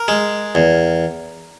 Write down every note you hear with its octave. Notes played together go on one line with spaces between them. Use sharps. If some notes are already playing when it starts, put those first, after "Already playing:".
Already playing: A#4
G#3
E2